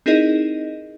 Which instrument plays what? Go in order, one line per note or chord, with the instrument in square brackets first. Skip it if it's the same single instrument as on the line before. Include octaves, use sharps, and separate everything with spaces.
[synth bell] C4 D#4 E4 G#4 A#4 D#5